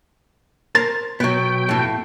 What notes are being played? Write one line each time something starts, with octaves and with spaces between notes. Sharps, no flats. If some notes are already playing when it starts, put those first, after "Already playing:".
A#4 C5 A#5 A6
B2 F#3 B3 G5
F2 A2